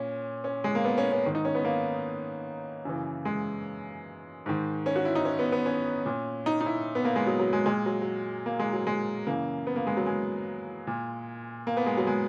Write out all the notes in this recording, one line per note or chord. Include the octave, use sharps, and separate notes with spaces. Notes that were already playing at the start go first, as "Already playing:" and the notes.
Already playing: A#2 C#4
C#4
G#3
A#3
B3
C#4
C#4
G#2 D#3
D#4
C#4
B3
A#3
F#2 C#3 E3
G#3
G#2 D#3
C#4
F#4
E4
D#4
C#4
B3
B3
C#4
A#2
D#4
D#4
E4
B3
A#3
G#3
F#3
F#3
G#3
A#2 G#3
F#3
F#3
A#3
G#3
F#3
G#3
F#2 C#3 E3 A#3
B3
A#3
G#3
F#3
G#3
A#2
A#3
B3
G#3
F#3
G#3